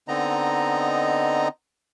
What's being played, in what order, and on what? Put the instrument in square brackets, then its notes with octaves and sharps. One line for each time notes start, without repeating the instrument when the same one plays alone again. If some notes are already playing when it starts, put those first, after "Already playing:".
[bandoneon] D3 B3 C4 D#4 D#5 A#5